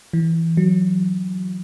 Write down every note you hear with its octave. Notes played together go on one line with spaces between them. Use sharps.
E3
F#3